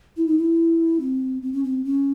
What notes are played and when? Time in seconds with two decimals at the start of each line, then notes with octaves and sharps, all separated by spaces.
0.17 E4
0.27 D#4
0.38 E4
1.00 C4
1.42 C4
1.53 C#4
1.64 C4
1.84 C#4